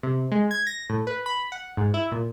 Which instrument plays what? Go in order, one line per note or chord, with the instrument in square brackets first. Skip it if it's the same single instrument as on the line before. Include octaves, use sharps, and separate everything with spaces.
[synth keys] C3
G#3
G#6
A#6
A2
B4
B5
F#5
G#2
E4
A#2